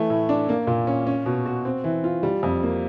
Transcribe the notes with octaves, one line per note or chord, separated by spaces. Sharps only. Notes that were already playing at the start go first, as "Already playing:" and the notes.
Already playing: E3 A3
A2
D4
A#3
A#2
C#4
C#4
B2
F#4
C4
E3
F4
G3
F2
A#3